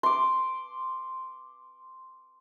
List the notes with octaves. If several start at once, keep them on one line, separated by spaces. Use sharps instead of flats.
C6 D6